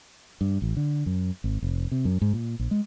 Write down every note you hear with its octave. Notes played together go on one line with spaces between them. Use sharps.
G2
A1
D3
F#2
G#1
F1
C3
F#2
G#2
A#2
A#1
G#3